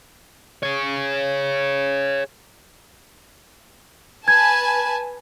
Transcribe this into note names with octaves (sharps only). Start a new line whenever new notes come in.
G#4 C#5
B4 G#5 A5 G#6